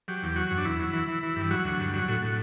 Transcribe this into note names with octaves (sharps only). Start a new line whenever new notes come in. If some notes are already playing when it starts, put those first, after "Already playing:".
F#3 G4
E2
F#3 F#4
F#2
D4
E2 E4
F#3
E3
E3
E3
G2
F#3 F#4
D2
G2
F#3
A2 F#4
A2